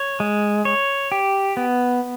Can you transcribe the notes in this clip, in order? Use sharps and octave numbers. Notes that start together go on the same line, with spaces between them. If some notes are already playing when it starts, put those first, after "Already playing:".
Already playing: C#5
G#3
C#5
G4
B3